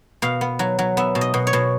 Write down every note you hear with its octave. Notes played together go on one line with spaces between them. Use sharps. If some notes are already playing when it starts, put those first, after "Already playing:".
B2 F5
B3
F#3
F#3
B3 E5
B2
D#5
B2
C#5
B2